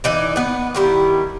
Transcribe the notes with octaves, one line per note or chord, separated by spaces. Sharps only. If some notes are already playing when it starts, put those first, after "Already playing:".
E3 D#4 D5
B3 B4
D#3 G3 E4